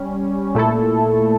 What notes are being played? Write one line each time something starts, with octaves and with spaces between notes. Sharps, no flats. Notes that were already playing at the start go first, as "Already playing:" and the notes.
Already playing: G3 C#4
A#2 A3 E4 A4